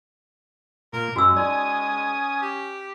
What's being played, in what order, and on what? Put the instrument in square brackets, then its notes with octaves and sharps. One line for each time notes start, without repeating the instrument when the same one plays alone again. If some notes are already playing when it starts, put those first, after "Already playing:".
[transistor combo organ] A#2 [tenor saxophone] A#4
[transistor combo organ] F#2 [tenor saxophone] G#3 [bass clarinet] C#4 [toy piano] F#4 E6
[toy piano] D#4 D5 [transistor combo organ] G#5 D#6
[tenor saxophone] G4